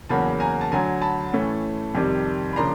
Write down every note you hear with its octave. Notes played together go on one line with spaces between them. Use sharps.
E2 C#3 F#3 A#3 A5 B5
G#5 A#5
A5
D2 D3 F#3 G#5 A#5
A5 B5
A2 E3 A3 C#4
F2 C3 D#3 G3
B5
C#3 F3 A#3 D4 A#5 C6